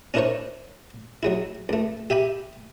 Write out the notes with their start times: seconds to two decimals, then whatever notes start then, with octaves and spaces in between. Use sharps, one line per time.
0.14 C#4 D4 E4 A#4 C5 C#5
1.23 F#3 G#3 E4
1.69 C#2 A3
2.10 G4 E5 G#5 B5